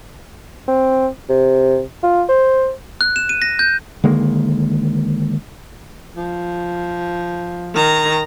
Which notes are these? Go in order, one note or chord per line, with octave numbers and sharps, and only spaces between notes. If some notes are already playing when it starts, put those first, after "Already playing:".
C4
C3
F4
C5
F#6
E7
D#7
A#6
G6
D3 D#3 G#3 A#3
F3
D#3 A#5